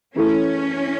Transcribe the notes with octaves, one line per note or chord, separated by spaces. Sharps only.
F#2 E3 A3 C#4 E4 A4